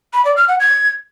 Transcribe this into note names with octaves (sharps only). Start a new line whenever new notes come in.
B5
D5
F6
F#5
G#6